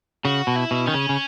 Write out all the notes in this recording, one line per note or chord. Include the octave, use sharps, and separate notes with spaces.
C#3 F#4
B2
E4
B2
D#3 C#4
C#3
C#3